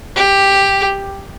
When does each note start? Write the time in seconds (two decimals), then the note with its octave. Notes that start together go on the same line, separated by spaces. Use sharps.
0.16 G4